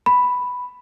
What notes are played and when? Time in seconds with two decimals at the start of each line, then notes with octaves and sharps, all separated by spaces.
0.06 B5